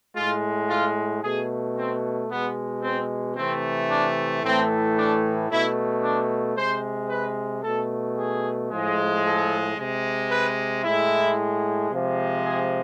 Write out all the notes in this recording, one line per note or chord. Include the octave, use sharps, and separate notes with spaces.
A2 G#3 F4
F4
B2 A3 G#4
C4
B2 G#3 B3
C4
C3 E3 A3 C4
D4
A2 E3 A3 C4
D4
B2 A3 E4
D4
C3 G#3 C5
B4
B2 A3 A4
G#4
A2 F3 G#3
A4
C3 G#3
B4
A2 G#3 E4
C3 F3 G#3
G#4